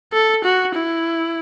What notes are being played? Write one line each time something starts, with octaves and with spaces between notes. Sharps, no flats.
A4
F#4
E4